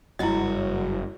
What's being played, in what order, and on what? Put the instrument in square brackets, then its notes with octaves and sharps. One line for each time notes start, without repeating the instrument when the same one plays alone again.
[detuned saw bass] F#1 [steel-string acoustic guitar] G2 F#4 [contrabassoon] F#3 [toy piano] E4 D#5